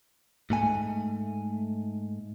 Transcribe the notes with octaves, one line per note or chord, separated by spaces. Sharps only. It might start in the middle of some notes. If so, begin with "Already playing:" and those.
G#2 A3 G#5